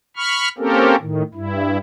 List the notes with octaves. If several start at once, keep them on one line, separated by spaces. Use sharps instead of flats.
B5 C#6 F6
A#3 C4 C#4 G4 A4 A#4
A2 D#3
G2 E4